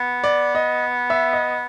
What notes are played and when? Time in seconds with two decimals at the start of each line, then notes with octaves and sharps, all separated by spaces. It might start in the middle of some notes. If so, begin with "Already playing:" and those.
Already playing: B3
0.24 D5
0.55 D#5
1.10 E5
1.33 D#5